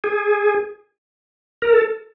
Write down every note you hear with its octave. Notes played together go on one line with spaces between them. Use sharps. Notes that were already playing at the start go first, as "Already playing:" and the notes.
G#4
A#4
A4